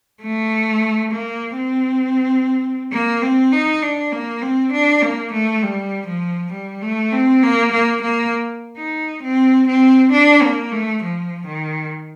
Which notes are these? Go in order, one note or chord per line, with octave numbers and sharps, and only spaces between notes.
A3
A#3
C4
A#3
C4
D#4
D4
A#3
C4
D4
A#3
A3
G3
F3
G3
A3
C4
A#3
A#3
A#3
D#4
C4
C4
D4
A#3
A3
F3
D#3